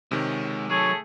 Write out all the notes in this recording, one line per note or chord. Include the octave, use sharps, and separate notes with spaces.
C3 D#3 G#3 C#5
F#3 A3 G#4 A4 C#5